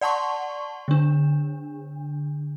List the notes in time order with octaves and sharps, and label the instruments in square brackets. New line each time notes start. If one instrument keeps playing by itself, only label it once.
[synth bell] D5 F#5 A5 C6 C#6
D3 D4